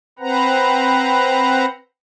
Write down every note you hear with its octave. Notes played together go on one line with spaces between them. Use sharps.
C4 B4 C5 F#5 A#5